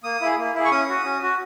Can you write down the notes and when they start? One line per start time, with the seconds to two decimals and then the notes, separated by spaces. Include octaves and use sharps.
0.04 A#3 D#6
0.21 E4 G#4
0.38 A#3
0.55 E4 G#4
0.65 C#6
0.71 C#4 D#6
0.89 F#4
1.04 C#4
1.22 F#4